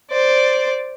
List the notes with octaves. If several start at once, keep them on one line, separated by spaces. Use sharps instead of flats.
C5 D5